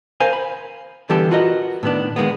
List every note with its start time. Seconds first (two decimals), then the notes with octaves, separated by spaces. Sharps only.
0.20 A#4 C5 F5 G#5
0.33 B5
1.10 D3 E3 G3 B3 G4 A4
1.31 F4 F#4 A#4 B4 D#5
1.83 A2 D#3 B3 D4
2.16 D#3 G#3 A#3 B3